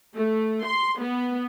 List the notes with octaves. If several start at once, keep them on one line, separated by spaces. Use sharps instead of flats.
A3
C6
B3